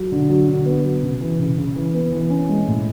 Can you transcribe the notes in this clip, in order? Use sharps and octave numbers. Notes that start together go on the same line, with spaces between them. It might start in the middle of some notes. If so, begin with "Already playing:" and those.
Already playing: F#3
D3
F#3
D3
B3
F#3
C#3
E3
C#3
C#3
E3
B3
E3
C#4
G#3
A2